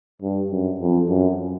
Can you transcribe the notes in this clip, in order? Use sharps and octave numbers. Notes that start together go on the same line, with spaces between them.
G2
F#2
F2
F#2